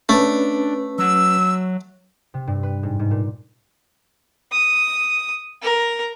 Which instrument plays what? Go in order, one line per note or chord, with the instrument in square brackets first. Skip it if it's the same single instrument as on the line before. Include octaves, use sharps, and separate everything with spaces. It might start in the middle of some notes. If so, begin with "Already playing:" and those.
[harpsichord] A3 [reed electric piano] C#4 B4 [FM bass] D4
[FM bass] F#3 [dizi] E6
[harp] C3
G2
B4
G#2
G#2
A#2
[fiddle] D#6
A#4